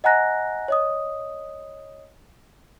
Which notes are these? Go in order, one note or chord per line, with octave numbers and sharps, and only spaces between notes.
D#5 F#5 G#5 A#5 F#6 A#6
C#5 D#5 D#6